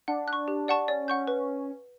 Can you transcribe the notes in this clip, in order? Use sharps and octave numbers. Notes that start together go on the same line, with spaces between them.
D4 F#5
F#6
C#6
G4
D5 F#5 A5 C#6
C#4 D5
F#5 C#6 G6
B4